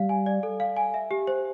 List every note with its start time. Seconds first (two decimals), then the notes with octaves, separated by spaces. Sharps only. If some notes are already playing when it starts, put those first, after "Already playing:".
Already playing: G3 F5
0.09 G#5
0.26 D5
0.43 A4
0.60 F5
0.77 G#5
0.94 E5
1.11 G4
1.27 C5